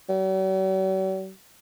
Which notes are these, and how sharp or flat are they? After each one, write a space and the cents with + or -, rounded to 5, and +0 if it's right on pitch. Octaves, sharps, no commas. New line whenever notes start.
F#3 +45